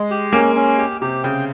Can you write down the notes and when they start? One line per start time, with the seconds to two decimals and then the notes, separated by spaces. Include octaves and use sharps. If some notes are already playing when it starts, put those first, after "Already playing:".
Already playing: G#3
0.11 G4
0.33 A#3 C#4
0.56 C#4
0.78 G4
1.01 C3 G4
1.23 C#3 G5